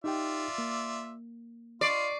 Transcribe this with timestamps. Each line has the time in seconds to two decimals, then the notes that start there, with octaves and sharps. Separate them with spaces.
0.04 D#4 F4 G4 D5 E5 G5
0.58 A#3
1.81 F4 D5 D#5 C#6 C7